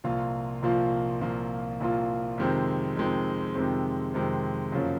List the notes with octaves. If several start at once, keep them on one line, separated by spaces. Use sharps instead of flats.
C2 A#2 F3 A#3 F4
C2 A#2 F3 A#3 F4
C2 A#2 F3 A#3 F4
C2 A#2 F3 A#3 F4
F2 C3 D#3 G#3 C4
F2 C3 D#3 G#3 C4
F2 C3 D#3 G#3 C4
F2 C3 D#3 G#3 C4
F#2 C#3 F3 A#3 C#4